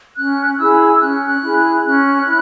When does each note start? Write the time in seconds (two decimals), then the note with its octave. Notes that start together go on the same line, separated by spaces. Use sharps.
0.16 C#4 F#6
0.58 E4 G#4 E6
1.00 C#4 F#6
1.28 F#6
1.43 E4 G#4
1.57 F#6
1.84 C#4 F#6
2.26 E4